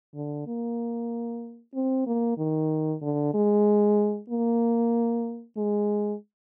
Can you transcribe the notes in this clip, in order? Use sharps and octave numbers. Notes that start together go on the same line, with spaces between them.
D3
A#3
C4
A#3
D#3
D3
G#3
A#3
G#3